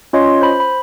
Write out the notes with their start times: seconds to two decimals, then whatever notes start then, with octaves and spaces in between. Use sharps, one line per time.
0.13 C#4 F4 C#5 D#5 C6
0.41 C5 B5
0.60 B5